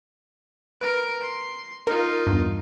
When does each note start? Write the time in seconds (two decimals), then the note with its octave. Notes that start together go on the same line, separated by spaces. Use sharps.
0.81 A#4 B4 D7
1.21 C6
1.87 D#4 F4 A#4
2.27 E2 G2